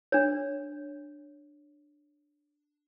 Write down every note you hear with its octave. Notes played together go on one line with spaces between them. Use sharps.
D4 C#5